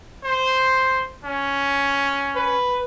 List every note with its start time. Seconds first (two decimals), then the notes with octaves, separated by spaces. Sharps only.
0.24 C5
1.25 C#4
2.36 B4